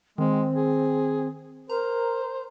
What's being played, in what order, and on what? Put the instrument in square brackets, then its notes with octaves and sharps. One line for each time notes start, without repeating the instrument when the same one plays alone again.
[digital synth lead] D#3 [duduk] G#3 [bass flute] C4
[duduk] G#4
[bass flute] A#4 [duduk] C5 [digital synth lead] A#5